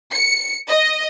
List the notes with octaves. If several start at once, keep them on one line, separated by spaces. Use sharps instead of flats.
C#7
D#5